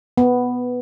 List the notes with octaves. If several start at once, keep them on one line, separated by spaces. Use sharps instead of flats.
B3